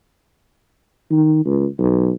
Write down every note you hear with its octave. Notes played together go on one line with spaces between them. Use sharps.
D#3
C#2
B1